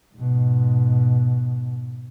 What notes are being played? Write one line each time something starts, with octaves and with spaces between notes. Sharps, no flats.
G#2 B2